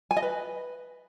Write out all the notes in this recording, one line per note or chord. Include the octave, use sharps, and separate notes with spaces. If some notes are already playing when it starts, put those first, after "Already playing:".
G#5
D#5
B4